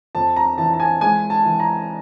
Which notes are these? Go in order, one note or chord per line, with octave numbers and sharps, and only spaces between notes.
F2 A5
A#5
E3 A5
A5
G#5
G#3 G#5
A5
E3
A#5